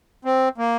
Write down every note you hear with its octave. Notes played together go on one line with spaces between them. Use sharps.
C4
A#3